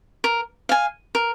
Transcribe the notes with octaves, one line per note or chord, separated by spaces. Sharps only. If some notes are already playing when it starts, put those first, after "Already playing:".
A#4
F5 G#5
A#4